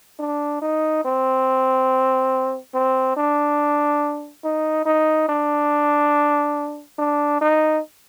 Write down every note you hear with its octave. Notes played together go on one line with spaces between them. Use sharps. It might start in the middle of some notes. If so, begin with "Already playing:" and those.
D4
D#4
C4
C4
D4
D#4
D#4
D4
D4
D#4